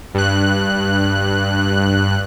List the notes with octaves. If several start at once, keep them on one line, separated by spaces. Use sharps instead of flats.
G2 F#6